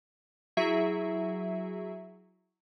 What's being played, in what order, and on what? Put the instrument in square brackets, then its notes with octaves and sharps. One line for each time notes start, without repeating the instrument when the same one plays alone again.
[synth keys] F#3 E4 F#4 G#4 E5